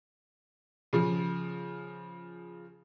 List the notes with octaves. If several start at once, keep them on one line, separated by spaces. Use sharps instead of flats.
C#3 F3